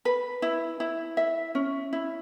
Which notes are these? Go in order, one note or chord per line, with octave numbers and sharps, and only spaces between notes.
B4
E4
E4
E5
C#4
E4